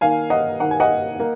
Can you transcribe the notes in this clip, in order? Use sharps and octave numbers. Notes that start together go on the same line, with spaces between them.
D#3 A#3 F5 G#5
D#5 F#5
D#3 A#3 F#5
G#5
D#5 F#5
A#3